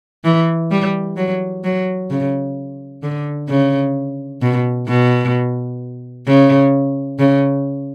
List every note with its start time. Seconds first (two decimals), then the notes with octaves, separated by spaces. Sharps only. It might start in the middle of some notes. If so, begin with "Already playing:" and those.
0.24 E3
0.71 G3
1.17 F#3
1.64 F#3
2.11 C#3
3.03 D3
3.49 C#3
4.42 B2
4.88 B2
6.27 C#3
7.19 C#3